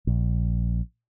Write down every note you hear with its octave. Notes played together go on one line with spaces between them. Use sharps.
A#1